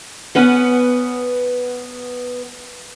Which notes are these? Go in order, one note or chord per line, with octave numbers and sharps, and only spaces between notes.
B3 C#4 B4 F#5